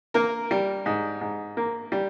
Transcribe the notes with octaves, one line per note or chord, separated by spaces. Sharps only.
A#3 A#4
G3
G#2
G#2
A#3
G3